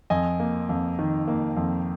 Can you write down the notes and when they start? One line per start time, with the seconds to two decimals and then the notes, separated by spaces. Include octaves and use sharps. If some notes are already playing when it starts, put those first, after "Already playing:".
0.10 F2 D#5 G#5
0.40 A#3
0.69 F2
0.99 D#3
1.28 A#3
1.57 F2